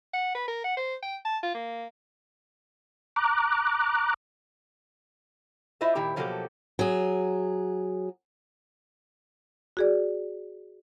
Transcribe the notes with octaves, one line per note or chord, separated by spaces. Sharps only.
F#5
B4
A#4
F#5
C5
G5
A5
F4
A#3
A#5 D6 F#6
E4 F4 C5 D#5 E5
A#2 D#3 E4 G4
B2 F3 F#3 A#3 G4 A4
F#3 G#4
F#4 G#4 D5